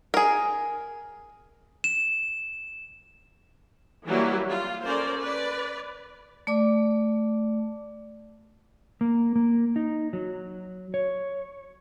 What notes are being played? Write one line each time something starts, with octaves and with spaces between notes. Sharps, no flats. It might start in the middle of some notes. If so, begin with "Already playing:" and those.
G#4 A#4
E7
E3 F#3 G3 A#3 E4 G4
F4
C#4 A4 A#4 C5 D5
B4 D5
A3 D5 D6
A#3
A#3
D#4
F#3
C#5